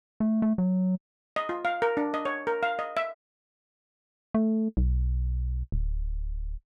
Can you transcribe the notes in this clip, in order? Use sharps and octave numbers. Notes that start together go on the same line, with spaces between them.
A3
A3
F#3
D#5
F4
F5
A#4
D4
D#5
C#5
A#4
F5
D#5
E5
A3
B1
D1